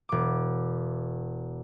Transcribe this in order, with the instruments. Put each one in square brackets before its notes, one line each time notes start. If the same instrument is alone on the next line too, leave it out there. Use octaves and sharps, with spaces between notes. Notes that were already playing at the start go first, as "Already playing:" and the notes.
[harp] E1 D6